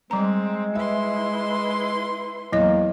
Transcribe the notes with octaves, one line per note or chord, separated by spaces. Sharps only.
G3 G#3 C4 A#5
E4 B4 E5 C6
E2 F#3 A#3 D#5